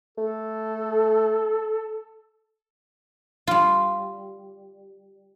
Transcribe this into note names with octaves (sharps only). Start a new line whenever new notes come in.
A3 A4
G3 F4